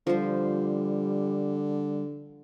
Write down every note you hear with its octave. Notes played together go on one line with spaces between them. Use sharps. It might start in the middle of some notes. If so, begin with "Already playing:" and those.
D3 F3 G3 C5